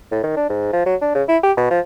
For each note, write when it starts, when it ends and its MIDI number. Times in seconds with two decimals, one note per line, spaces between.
0.11 0.21 45
0.23 0.33 51
0.36 0.46 62
0.49 0.68 44
0.73 0.85 53
0.86 0.96 54
1.02 1.13 62
1.15 1.23 49
1.28 1.37 64
1.43 1.52 67
1.57 1.68 47
1.70 1.80 53